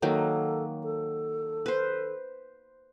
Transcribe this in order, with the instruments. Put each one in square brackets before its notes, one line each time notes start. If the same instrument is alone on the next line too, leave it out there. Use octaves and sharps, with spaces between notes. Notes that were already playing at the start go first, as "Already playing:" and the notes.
[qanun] D#3 F#3 A#3 [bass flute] A4
[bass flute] A4
[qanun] B4 C5